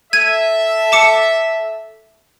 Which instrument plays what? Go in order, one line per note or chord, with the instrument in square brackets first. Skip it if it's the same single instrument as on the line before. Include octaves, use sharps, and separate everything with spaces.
[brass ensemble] A4 E5 [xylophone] G#6 D#7
[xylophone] A5 D6 C#7